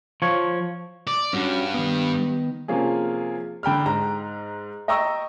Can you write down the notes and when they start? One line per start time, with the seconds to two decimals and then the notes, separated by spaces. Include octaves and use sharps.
0.22 F3 C#5
1.07 D5
1.33 G2 C#4 F#4
1.74 D#3 B3
2.68 C3 F3 A#3 C#4 F4 G#4
3.63 D3 G5 B5 F6
3.86 G#2 A#5
4.88 D#5 G5 A#5 C#6 E6